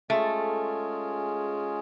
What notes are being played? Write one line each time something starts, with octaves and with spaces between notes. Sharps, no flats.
G#3 A3 C#4 F4 G#4